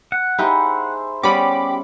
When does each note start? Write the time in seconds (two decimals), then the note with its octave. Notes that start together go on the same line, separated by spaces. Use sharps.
0.12 F#5
0.38 D#4 E4 G4 G#4 C5
1.23 G3 B3 C#4 G4 B5 D6